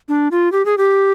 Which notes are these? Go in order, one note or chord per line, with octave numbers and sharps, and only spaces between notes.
D4
F4
G4
G#4
G4